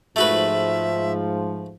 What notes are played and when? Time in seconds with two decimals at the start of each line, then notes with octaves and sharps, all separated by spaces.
0.16 G#2 F3 A3 F#4 B4 E5